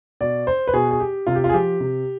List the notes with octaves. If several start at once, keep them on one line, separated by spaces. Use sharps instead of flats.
B2 D5
C5
B4
B2 G#4
G#4
G4
C3 F4
G4
F4
G#4
F3 G4
C3